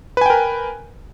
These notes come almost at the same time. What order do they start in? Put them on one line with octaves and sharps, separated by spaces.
B4 G#5 G5 A#4